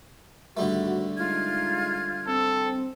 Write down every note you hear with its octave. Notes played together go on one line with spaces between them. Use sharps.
G#1 D3 G3 A3 F#4
G#3 D#4 F4 F6 G#6
C4 A4